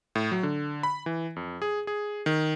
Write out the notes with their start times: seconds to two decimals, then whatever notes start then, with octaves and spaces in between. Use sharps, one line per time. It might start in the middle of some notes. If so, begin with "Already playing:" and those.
0.15 A2
0.32 F#3
0.43 D3
0.83 B5
1.06 E3
1.36 F2
1.62 G#4
1.87 G#4
2.26 D#3